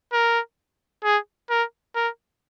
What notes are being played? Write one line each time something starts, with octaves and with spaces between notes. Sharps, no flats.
A#4
G#4
A#4
A#4